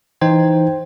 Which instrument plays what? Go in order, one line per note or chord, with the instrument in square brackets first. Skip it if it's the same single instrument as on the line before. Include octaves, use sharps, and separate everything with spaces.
[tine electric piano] E3 D#4 C5 G5 G#6